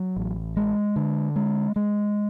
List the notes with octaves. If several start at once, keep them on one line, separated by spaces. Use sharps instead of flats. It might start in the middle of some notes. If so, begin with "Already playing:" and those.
Already playing: F#3
A1
G#3
D3
G#3
G#3